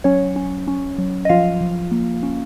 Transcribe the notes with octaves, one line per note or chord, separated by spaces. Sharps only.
F#3 C#4 C#5
C#4
C#4
F#3
D#5
F3 F4 F5
F3
A#3
C#4